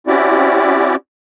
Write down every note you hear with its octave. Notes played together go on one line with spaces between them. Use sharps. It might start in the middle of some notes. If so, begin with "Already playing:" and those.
C4 C#4 E4 F#4 G4 D5